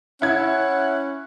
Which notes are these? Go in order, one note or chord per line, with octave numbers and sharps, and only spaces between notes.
C#4 E4 F#5 G#6